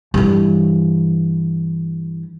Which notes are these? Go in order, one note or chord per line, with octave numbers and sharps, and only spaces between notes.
G2 E3